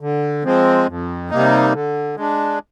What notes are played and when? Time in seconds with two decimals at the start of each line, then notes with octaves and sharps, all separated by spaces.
0.01 D3
0.44 F3 G#3 C4
0.88 F2
1.30 C3 G3 A#3 D#4
1.73 D3
2.16 G#3 D4